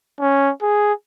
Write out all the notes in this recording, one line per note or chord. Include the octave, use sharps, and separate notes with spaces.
C#4
G#4